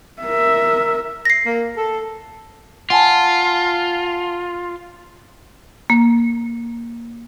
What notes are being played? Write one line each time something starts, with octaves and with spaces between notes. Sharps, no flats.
A#4 E5
A#6 C7
A#3
A4
F4 F#5 G#5 A5
A#3